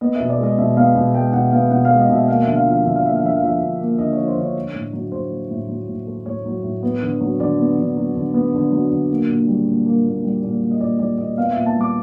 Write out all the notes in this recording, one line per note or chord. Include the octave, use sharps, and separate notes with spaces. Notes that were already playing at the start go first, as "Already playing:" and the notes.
B3 D#5
B2 E5
D5
G#3
D#5
B2 E5
B3 F5
B2
G#3 G5
B2 F#5
B3 F5
B2 F#5
F5
G#3
D#5
B2 E5
A#3 F5
D3 E5
F5
F3
F5
D3 E5
F5
A#3 E5
F5
D3 E5
F5
F3 E5
D3
A#3
D3 D#5
C#5
F3
C5
D3 C#5
A3
A2
F#3
A2 C5
A3
A2
F#3
A2
A3
A2 C#5
F#3
A2
B3
D3
F#3
D3 D5
B3
D3
F#3
D3
B3
D3
F#3
D3
A#3
A#2
G3
A#2
A#3
A#2
G3
A#2
A#3
D#5
A#2 D5
G3 D5
A#2 D#5
B3 F5
A#2 E5
A5
G3 D6